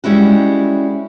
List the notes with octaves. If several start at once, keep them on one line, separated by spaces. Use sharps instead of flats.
G3 G#3 C#4 E4 F#4